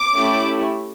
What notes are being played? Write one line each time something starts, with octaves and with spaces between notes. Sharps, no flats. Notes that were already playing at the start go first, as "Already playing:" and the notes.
Already playing: D6
A3 C#4 E4 G4